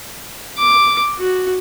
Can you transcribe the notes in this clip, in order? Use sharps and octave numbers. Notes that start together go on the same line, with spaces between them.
D6
F#4